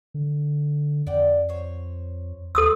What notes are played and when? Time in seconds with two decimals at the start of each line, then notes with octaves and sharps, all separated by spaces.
0.14 D3
1.07 F2 D5 F#5 G5
1.49 C5 C#5
2.55 D#2 A4 D#6 E6